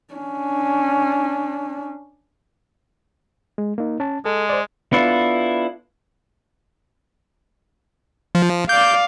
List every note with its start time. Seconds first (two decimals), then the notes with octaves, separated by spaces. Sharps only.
0.14 C#4 D4
3.58 G#3
3.78 A#3 D#4
4.00 C#4 A5
4.25 G#3 A4
4.49 C5 D5
4.93 B3 D4 E4 F4 A4
8.35 F3
8.69 D5 F5 D6 G6